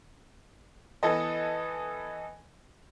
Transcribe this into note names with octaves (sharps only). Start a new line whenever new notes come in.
E3 B3 A4 D#5